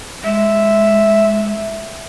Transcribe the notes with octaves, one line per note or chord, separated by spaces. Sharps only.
G#3 E5